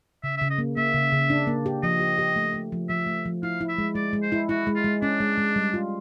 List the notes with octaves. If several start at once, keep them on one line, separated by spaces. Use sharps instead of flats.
C#3 E5
C#3 E5
D#5
A#3
A#3 E5
C#3
C#3
D4
A#3
G4
F3 D#5
G4
G4
A3
A3
F3
F3 E5
A3
F3
E4 F5
E4
E5
G#3
G#3 D5
G#3
C5
E4
E4 F#4
G#3
F4
G#3
C#4 D4
G#3
G#3
G3
F4